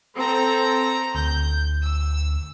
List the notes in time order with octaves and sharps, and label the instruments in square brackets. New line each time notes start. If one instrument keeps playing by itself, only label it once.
[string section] C4 A4 A#5
[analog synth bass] D2 [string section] G6
[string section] E6